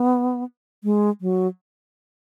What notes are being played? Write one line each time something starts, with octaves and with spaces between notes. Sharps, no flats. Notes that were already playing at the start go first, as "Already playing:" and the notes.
Already playing: B3
G#3
F#3